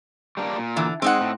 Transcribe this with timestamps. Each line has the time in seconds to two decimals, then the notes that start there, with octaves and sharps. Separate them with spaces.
0.37 G3 A#3 D4
0.58 A#2
0.76 D3 E3
1.02 G#3 C4 D#4 F#5
1.21 A2